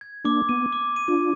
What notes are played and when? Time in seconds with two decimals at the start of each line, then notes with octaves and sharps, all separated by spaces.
0.01 G#6
0.24 A#3 D4 D6
0.49 B3 D#7
0.73 D6
0.96 D#7
1.08 D4 F4